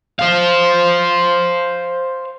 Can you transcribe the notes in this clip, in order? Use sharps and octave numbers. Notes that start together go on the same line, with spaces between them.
C5 F5